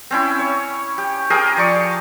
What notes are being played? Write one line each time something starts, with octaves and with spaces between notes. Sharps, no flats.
C4 C#4 E4
C#5
G4
G4 G#4 A#4 G5
F3 D5 C#6